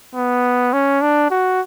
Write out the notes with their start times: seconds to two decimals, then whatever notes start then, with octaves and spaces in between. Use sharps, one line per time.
0.15 B3
0.73 C#4
1.02 D4
1.31 F#4